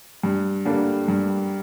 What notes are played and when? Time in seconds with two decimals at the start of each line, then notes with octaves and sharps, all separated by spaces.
0.23 G2
0.65 D3 G3 A#3 D4
1.08 G2